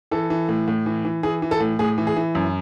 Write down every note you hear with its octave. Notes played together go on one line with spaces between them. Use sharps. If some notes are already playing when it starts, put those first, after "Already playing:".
E3 A4
E3
A2
A2
E3
E3
E3 G#4
E3
A4
A2
A2 G#4
E3
G#4
E3
F#2